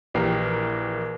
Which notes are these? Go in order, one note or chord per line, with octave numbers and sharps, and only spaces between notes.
A#1 E3 A#3 G4 A#4 C7